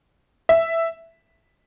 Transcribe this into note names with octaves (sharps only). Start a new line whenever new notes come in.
E5